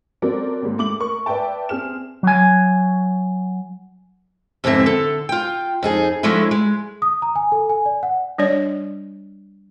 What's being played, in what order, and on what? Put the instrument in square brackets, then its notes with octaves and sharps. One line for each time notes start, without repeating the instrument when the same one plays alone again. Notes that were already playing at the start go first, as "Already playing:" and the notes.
[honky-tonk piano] F#3 C4 F#4 A4 A#4 D5
D#2 G#2
A3 D6 F#7
A#4 C#6
B4 D5 E5 G5 A5
C4 G#4 F6 E7
[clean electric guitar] F#3 G#5
[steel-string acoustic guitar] F2 G#2 D3 E3 C4 E5
D3 A4
F4 G5
F2 D#4 G#4
F3 F#3 G#3 A3 D4 E4
G#3
[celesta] D#6
A#5
G#5
A4
G#5
D5
F#5
[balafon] G3 D4 C#5 D5